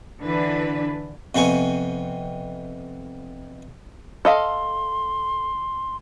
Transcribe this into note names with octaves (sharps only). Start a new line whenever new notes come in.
D3 E3 D4 B4
F2 C3 B3 G#5 C#6
A4 D#5 F5 C6